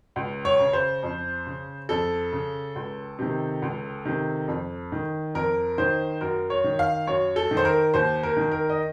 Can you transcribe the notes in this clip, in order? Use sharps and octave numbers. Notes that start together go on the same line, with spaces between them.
C#2
C#5
C#3
C5
F2
C#3
F2 A4
C#3
C#2
C3 D#3
C#2
C3 D#3
F2
D#3
F2 A#4
D#3 C5
F#2 A#4
C#5
D#3
F5
F#2 C#5
A4
D#3
C5
A#4
D#2 C5
A#4
D#3
A#4
D#5